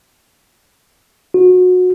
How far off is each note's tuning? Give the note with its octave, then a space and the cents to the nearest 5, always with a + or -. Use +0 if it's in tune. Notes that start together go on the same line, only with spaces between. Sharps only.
F#4 -25